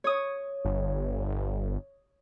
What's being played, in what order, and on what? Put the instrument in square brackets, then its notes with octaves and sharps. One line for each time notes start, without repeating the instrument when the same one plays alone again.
[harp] C#5 D#6
[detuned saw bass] G1